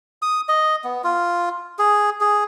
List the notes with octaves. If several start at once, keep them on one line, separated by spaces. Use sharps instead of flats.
D#6
D#5
B3
F4
G#4
G#4